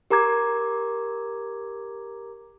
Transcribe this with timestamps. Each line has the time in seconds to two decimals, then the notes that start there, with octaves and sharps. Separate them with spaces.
0.10 G4 A#4 A#5 D6 G#6